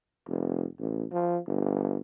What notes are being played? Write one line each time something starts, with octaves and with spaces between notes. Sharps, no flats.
F1
A1
F3
G1